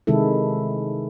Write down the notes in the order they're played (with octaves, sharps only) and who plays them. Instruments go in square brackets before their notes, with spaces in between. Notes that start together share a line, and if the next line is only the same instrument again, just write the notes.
[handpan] C3 D#3 G#3 E4 A4